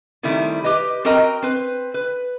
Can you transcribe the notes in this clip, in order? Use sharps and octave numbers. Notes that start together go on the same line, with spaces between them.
C3 D#3 G3 A3 E4
G4 B4 D#5
C4 F#4 A#4 D#5 G5 A#5
C4 B4
B4